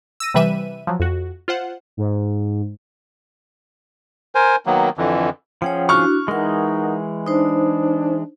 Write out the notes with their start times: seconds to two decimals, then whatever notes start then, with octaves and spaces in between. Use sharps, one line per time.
0.20 E6 A#6 D#7
0.34 C3 E3 G3 B4 E5 D#7
0.87 F3 F#3
1.00 F2 F#4
1.48 F4 C5 F#5
1.97 G#2
4.35 A#4 C5 G#5
4.66 D#3 F#3 A#3 B3
4.98 F2 D3 E3
5.62 F3 C#4 G#4 C#5 F#5 G5
5.89 D4 E4 F#4 C#6 F6
6.28 E3 G#3 D#4 A#4 F#5
7.27 D4 D#4 C5